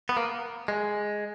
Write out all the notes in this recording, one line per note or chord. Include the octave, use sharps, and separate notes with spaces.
B3
A#3
G#3